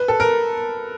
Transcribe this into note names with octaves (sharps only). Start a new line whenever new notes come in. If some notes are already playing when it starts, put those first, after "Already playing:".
Already playing: B4
A4
A#4